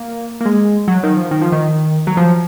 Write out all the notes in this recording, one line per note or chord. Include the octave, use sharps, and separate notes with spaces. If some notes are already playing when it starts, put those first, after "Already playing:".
Already playing: A#3
A#3
G#3
F#3
D#3
F3
D#3
F3
D#3
F#3
F3